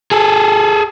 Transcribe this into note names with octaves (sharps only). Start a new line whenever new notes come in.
G#4 A4